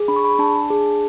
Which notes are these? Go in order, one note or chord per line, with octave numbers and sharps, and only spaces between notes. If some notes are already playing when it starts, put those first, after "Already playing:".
Already playing: G#4
D4 B5
C#6
B5
D4 A5
G#4